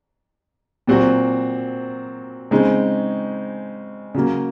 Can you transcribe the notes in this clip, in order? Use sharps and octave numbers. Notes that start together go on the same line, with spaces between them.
A#2 F#3 C4 F#4
C#3 G#3 C4 D#4
C#3 F#3 A#3